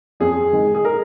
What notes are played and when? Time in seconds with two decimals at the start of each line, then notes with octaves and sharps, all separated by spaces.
0.20 F2 G#4
0.53 D#3 G#3
0.75 G#4
0.85 A#4